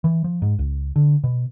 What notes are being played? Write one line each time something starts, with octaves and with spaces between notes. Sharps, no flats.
E3
F3
G#2
C#2
D3
B2